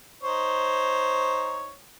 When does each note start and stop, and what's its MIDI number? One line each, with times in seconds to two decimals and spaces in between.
0.23 1.71 63
0.23 1.71 72
0.23 1.71 73